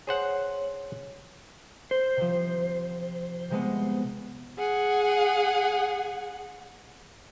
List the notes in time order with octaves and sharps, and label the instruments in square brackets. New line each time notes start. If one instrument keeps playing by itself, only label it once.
[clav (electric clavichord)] G#4 C5 F#5 [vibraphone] C#5
[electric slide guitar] C5
[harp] C3 F3
C3 G#3 B3
[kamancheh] G#4 F#5